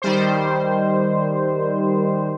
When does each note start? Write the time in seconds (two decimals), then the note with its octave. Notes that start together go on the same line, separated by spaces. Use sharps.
0.02 D#3 G3 C5